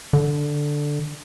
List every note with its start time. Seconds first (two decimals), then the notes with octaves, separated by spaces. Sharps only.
0.13 D3